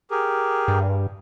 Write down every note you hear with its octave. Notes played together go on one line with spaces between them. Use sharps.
G4 G#4 A#4
G2